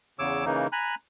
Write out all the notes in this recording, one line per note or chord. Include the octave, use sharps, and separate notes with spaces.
E2 C#3 C#5 D6 E6
C#3 E3 A#3 D#4
G#5 A#5 B5 F#6